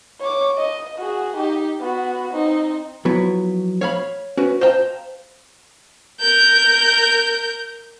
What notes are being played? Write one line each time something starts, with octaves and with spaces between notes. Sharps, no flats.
C#5 D6
D#5
F#4 G#4
D#4 G4
B3 F#4
C4 D#4
F3 F#3 B3 E4
C#5 F5 B5
C#4 F#4 B4
C5 D#5 F5 G5 A5 A#5
A#4 G6